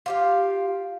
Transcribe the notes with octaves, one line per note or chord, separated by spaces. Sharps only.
F4 G4 F5